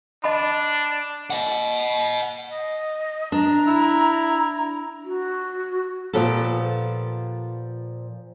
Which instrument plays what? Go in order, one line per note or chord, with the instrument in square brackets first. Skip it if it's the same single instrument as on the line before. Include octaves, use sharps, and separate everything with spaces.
[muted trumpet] D4 [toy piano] D#5 A5 B5
[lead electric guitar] D#5 F#5
[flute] D#5
[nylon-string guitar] D4 [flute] A#5
[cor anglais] E4
[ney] F#4
[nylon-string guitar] A#2 F3 B3 G4 A4